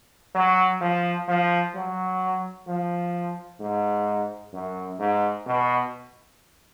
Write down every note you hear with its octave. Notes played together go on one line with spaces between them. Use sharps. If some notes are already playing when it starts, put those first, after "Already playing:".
F#3
F3
F3
F#3
F3
G#2
F#2
G#2
B2